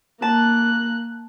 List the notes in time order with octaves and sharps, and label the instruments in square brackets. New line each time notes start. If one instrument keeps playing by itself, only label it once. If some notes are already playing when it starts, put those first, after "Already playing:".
[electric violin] A#3 F#6 [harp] A5